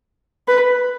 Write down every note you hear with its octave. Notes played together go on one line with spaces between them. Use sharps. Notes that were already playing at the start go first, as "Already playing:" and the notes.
B4